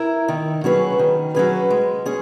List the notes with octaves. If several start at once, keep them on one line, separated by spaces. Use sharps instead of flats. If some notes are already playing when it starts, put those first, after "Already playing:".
Already playing: E4 A#4
D#3
F#3 C#4 G#4 B4
D#3
F#3 C#4 G#4 B4
G#3
C#4 G#4